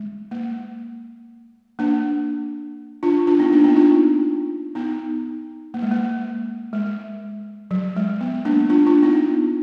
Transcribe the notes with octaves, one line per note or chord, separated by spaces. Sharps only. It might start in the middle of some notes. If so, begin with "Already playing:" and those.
Already playing: G#3
A#3
A#3 D4
D4 F4
D4 F4
B3 D#4
A#3 D4
B3 D#4
D4 F4
B3 D#4
A#3
G#3
A#3
G#3
F#3
G#3
B3
A#3 D4
D4 F4
D4 F4
B3 D#4